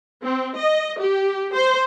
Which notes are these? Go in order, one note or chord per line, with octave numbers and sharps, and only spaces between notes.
C4
D#5
G4
C5